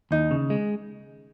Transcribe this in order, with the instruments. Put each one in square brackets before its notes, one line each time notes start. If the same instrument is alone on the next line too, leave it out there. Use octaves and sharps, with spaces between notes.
[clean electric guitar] D#2 [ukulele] D#4
[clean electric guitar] C#3
G#3